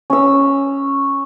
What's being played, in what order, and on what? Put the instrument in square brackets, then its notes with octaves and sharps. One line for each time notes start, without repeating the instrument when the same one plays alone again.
[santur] C#4 E6